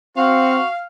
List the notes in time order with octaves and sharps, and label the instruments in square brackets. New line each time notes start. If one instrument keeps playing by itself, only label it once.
[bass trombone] C4 [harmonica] F#4 C#6 [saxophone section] F5